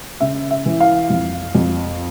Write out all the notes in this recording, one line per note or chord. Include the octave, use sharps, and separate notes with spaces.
C#3 E5
E5
E3
F5
F2
F2